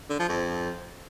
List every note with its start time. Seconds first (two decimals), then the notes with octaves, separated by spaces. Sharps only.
0.09 D3
0.19 F3
0.29 F2